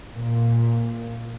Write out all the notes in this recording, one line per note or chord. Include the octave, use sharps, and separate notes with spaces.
A#2